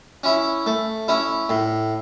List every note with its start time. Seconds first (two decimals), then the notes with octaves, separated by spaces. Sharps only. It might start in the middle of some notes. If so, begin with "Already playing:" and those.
0.24 C#4 E4
0.66 A3
1.08 C#4 E4
1.49 A2